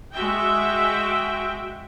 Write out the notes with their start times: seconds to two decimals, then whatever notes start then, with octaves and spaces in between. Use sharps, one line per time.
0.12 G#3 F#4 E5 G5